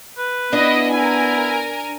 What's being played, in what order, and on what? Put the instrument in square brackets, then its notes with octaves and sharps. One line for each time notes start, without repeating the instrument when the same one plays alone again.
[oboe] B4
[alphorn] B3 [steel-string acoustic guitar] D4 [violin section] E4 D#5
[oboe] E4 [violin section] A#4 G#5